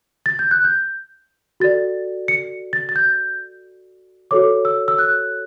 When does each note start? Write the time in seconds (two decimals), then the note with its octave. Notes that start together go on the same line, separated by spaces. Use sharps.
0.26 A6
0.39 G6
0.51 F#6
0.64 G6
1.60 F#4 A4 D5 A6
2.28 C#7
2.73 A6
2.89 A6
2.96 G6
4.31 F#4 A4 C#5 D6
4.65 E6
4.88 E6
4.99 F#6